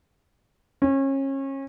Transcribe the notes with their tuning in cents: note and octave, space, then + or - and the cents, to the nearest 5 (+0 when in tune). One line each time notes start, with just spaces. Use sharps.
C#4 -30